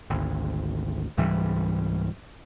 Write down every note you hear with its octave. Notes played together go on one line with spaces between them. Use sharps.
G#1 D2
C#2 G#2 E3 G3